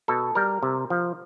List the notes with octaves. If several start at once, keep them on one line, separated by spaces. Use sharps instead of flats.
B2 A4
G3 A#4
C3
F3